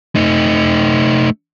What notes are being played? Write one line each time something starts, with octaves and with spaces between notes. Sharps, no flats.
A3 D#4